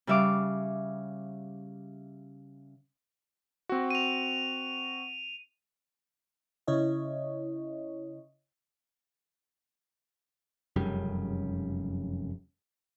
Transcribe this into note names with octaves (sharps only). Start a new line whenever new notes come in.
C#3 G3 E5 F5 D6
C4 F#4
D#7 F7
C#3 E4 C#5 D#5
F1 F#2 C#3 G3